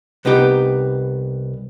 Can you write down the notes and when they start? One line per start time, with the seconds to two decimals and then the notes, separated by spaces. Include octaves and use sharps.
0.25 C2 B3 D#4 G4